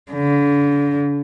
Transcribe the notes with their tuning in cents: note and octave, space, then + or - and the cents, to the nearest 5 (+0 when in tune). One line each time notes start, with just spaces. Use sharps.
D3 -40